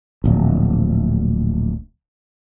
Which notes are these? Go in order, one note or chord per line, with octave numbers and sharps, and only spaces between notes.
D1 A#1